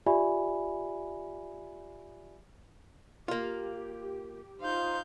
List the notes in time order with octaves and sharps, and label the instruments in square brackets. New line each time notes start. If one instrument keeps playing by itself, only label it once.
[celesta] F4 G4 D5 E5 G#5 B5
[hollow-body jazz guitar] A#3 F4 [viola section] G4
[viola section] D#4 F4 [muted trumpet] C5 [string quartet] F5 G6